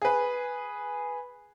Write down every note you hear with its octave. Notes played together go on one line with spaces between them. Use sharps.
G#4 B4